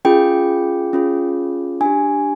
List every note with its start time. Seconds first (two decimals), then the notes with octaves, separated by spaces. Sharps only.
0.05 C#4 F4 G#4 G5
0.93 C#4 F4 G#4
1.81 D4 G4 G#5